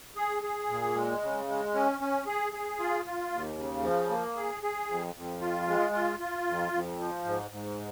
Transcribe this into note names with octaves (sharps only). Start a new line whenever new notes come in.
G#4
G#4
A#2
G#3
C#3
G#3
C#4
C#4
G#4
G#4
F4
F4
D#2
C#3
F3
A#3
G#4
G#4
F2
F2
F4
G#3
F4
F4
F2
F2
F3
G#2
G#2